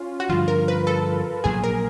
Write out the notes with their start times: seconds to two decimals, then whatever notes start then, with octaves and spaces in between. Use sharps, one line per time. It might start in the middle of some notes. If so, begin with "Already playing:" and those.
Already playing: C#4 F4
0.20 F#4
0.29 G2 D3 F3 F4
0.48 A#4
0.68 B4
0.87 A4
1.44 A#1 A#2 F#3 A#3 G#4
1.63 A#4